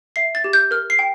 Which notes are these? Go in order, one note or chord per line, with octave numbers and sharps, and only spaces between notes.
E5 C7
A6
G4
G6
A#4 F6
C7
G5